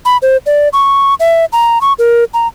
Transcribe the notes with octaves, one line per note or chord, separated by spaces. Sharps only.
B5
C5
D5
C#6
E5
A#5
C#6
A#4
A#5